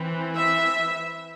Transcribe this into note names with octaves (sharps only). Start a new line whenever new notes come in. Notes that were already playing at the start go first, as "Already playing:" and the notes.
Already playing: E3 C4
E5